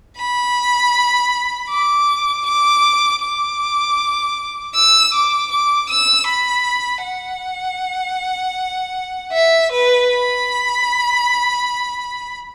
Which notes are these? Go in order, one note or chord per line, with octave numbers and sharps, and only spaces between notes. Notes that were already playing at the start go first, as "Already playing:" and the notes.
B5
D6
D6
D6
E6
D6
D6
E6
B5
F#5
E5
B4
B5